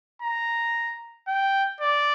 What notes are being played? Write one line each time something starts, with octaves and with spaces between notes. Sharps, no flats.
A#5
G5
D5